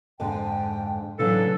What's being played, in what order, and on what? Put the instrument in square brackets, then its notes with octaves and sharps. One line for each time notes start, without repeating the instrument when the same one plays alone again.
[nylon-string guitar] F2 G#2 D3 [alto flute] G5
[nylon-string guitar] A2 C#3 E3 [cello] F#3 [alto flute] D4 [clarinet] A4